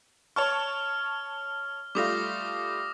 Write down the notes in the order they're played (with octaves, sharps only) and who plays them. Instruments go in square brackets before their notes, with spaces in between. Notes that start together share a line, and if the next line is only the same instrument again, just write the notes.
[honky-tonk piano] C#5 A5 C#6 [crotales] F6
[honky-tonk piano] G3 A3 F4 [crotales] D6 D#6 A#6